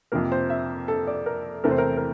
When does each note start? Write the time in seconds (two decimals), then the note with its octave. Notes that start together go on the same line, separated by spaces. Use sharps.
0.12 F2 C3 F3 A#3 A#4
0.32 C5
0.50 E5
0.88 A4
1.07 D5
1.26 A#4
1.64 E2 C3 E3 A3 C4 A#4
1.71 C5
1.78 A#4
1.97 A#4